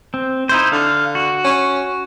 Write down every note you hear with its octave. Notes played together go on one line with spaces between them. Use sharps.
C4
D#4 E4 C5
D3 F5
F#4
C#4